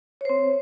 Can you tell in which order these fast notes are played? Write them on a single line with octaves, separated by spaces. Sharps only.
C#5 C5 C4